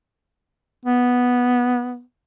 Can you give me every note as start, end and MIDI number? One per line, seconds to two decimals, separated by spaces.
0.85 2.01 59